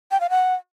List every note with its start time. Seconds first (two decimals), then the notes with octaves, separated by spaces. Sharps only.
0.11 G5
0.20 F5
0.30 F#5